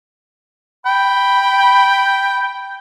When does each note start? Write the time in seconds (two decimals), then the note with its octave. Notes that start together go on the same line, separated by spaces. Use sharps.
0.86 G5 B5